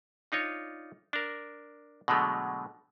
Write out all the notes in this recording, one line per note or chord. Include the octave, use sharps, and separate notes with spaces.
D4 D#4 F4 C#5
D4 A#4
B2 D3 F#3 G#3 A3